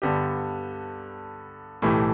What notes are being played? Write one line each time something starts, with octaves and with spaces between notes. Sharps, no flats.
G2 D3 B3 G4
B1 A2 E3 A3 G4